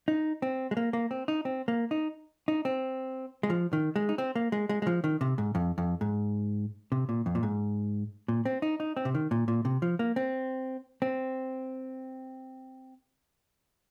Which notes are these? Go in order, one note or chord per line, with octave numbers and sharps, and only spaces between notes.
D#4
C4
G#3
A#3
A#3
C4
D#4
C4
A#3
D#4
D#4
C4
G#3
F3
D#3
G#3
D#4
C4
A#3
G#3
G#3
G#3
F3
D#3
C3
G#2
F2
F2
G#2
C3
A#2
F2
A#2
G#2
A#2
C4
D#4
D#4
C4
C3
D#3
A#2
A#2
C3
F3
A#3
C4
C4